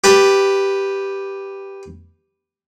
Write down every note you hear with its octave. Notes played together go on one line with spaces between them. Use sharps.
G4 B4 A5